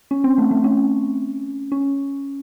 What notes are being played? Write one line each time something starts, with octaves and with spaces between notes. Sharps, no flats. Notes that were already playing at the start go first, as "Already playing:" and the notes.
C#4
C4
A3
A3
C#4
C#4